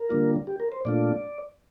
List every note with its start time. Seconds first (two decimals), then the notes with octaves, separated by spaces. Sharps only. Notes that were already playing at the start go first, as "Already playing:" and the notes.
Already playing: A#4
0.09 D3 G3 A#3 D4 F4
0.47 G4
0.60 A#4
0.72 C5
0.85 A#2 A3 D4 F4 D5